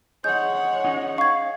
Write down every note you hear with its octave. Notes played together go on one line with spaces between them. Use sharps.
G#3 C#5 F#5 G6
C#4 D#4
F5 C#6 G#6